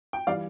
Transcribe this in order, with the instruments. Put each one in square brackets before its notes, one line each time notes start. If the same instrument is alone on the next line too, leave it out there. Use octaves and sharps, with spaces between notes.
[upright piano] G5
E3 G3 D5 F5